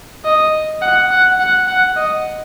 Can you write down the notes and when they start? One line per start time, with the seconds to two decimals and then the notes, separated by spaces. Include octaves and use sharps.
0.25 D#5
0.82 F#5
1.11 F#5
1.40 F#5
1.68 F#5
1.96 D#5